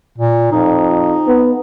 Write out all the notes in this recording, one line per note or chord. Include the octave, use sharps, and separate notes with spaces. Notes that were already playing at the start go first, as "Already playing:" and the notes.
A#2
F2 D#4
B3